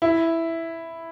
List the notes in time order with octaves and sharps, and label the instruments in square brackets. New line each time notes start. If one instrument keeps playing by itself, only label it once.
[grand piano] E4